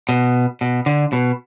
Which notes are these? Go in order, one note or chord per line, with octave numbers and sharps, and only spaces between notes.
B2
B2
D3
B2